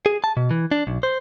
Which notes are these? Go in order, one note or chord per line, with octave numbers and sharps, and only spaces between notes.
G#4
A5
B2
E3
D4
B1
C5